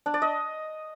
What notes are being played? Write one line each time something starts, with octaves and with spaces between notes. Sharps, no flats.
D4
D5
D#5